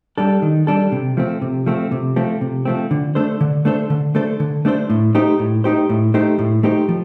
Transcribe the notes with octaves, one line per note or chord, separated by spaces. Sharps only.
G3 D4 A4
D#3
G3 D4 A4
C3
F3 A3 C4
C3
F3 A3 C4
C3
F3 A3 C4
C3
F3 A3 C4
D3
A3 D4 A4 C5
D3
A3 D4 A4 C5
D3
A3 D4 A4 C5
D3
A3 D4 A4 C5
A2
A3 D#4 G4 C5
A2
A3 D#4 G4 C5
A2
A3 D#4 G4 C5
A2
A3 D#4 G4 C5
F3